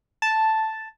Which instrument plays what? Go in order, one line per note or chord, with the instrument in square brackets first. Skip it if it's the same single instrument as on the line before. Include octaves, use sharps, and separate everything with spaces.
[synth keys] A5